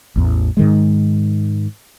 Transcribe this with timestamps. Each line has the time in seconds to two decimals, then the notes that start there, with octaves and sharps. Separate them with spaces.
0.16 A1 E2
0.57 G#2 D#3 G#3